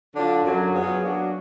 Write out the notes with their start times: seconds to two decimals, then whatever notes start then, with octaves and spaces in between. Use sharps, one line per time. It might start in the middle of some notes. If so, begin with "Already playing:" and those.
0.13 D3 F#3 D4 F4
0.42 F#2 D3 F#3
0.71 F#3 B3 F4 G#4
1.01 F#3 A#3 D4 F#4